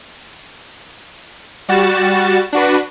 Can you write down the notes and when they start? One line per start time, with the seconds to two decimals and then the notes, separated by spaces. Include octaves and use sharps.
1.69 G3 F#4 A6 E7
2.53 D4 F#4 B4